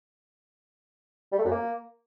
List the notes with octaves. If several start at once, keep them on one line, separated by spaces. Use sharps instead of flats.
G3
A3
F#2
A#3